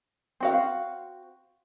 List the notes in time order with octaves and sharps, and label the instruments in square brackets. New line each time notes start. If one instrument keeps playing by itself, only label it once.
[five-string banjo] C4 F#4 F5